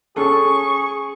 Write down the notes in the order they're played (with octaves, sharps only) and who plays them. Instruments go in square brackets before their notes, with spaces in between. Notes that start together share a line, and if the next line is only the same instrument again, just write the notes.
[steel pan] C#4 A4 [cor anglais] G#4 [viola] C#6